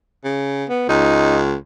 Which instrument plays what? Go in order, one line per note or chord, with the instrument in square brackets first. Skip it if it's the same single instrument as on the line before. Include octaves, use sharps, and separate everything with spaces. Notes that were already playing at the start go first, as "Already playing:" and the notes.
[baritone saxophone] C#3
[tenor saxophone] B3
[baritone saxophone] C#2 [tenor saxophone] D#4